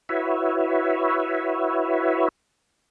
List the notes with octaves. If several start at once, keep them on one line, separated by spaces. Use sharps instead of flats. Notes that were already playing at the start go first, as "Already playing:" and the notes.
E4 F#4 B4 C#5 E5